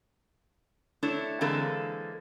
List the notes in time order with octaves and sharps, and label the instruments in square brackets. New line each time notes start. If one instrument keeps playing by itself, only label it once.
[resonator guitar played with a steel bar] A3 D4 E4 C#5
D3 E3 G#3 A#3 C4 A4